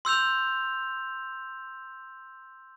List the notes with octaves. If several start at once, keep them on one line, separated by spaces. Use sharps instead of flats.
C6 E6 G6 F7